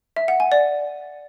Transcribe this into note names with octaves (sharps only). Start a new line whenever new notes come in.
E5
F#5
G#5
D5